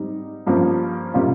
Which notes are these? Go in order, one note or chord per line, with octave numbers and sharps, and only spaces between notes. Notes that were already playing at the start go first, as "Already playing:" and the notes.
Already playing: G#2 G3 C4 D#4
G2 F3 A#3 C#4
C3 G3 A#3 C#4 F4